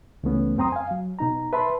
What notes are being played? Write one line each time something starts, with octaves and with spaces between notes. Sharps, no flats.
C#2 E3 A3 B3 C#4
F#2 C4 G5 A#5 C6 D#6
F5 G#5
F#3
B2 D#4 A#5
B4 E5 A5 B5 C6